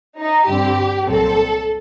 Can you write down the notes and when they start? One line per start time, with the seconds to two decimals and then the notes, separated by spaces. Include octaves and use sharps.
0.17 D#4
0.46 G2 D3 G3 C4 G4
1.06 C2 A#2 F#3 C4 A4